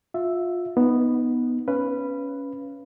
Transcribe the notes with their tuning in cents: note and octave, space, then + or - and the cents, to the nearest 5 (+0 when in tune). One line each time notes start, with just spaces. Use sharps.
F4 +25 E5 +0
B3 +0 D#4 +0
C#4 +5 B4 +0 F5 -25